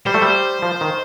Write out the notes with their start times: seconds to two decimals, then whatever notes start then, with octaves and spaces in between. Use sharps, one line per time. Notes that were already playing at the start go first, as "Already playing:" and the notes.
0.07 G3 C5
0.14 A3
0.22 G3
0.62 F3
0.81 D#3